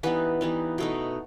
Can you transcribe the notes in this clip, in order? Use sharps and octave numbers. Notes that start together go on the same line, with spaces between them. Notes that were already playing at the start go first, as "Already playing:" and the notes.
E3 G3 B3 D#4 B4
E3 G3 B3 D#4
B2 A3 D#4